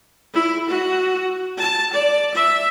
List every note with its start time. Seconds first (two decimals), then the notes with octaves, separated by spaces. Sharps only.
0.34 E4
0.69 F#4
1.58 A5
1.93 D5
2.34 E5